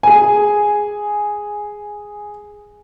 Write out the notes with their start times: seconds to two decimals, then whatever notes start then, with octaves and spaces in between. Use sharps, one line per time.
0.03 G#4 G#5